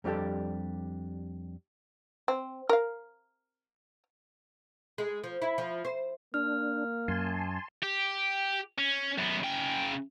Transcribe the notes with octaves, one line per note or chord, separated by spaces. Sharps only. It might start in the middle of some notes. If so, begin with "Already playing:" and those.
F2 G3 D4 G4 A4
C4
A#4 F5
G#3
F3
E4
F3
C5
A#3 D4 F6
F#2 G#5 A5 C6
G4
C#4
F#2 B3
C#3 G5